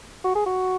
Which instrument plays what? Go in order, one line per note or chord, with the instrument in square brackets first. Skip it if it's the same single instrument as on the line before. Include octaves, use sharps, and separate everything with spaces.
[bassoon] F#4
G#4
F#4